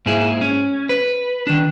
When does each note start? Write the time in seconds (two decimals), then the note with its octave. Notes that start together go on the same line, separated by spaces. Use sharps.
0.06 G#2 A#3 E4 G#4
0.41 C#4
0.89 B4
1.47 D#3 D4